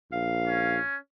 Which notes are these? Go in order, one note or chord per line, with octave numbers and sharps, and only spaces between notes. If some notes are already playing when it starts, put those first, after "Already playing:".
A#1 F5
C#4